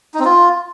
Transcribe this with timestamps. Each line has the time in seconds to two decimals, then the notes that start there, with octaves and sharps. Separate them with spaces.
0.14 D#4
0.20 C4
0.25 F4